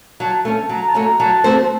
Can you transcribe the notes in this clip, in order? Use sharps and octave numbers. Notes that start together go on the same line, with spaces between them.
F#3 A5
A3 C#4 A5
F#3 A#5
A5
A3 C#4 F#4 A#5
F#3 A5
A3 C4 F#4 C5